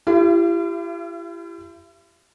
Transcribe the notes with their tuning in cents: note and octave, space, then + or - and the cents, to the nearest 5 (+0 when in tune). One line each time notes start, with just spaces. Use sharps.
E4 +40 G4 +0 F5 -40